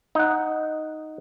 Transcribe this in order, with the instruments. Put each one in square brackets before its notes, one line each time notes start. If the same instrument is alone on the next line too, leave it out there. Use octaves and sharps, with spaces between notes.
[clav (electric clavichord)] D#4 F#5